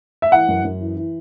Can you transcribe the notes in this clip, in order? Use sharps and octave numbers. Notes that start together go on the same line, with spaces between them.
E5
E3 F#5
F#2
F#2
E3
E3